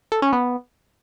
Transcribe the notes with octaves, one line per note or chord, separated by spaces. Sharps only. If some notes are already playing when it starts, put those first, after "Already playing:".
A4
C#4
B3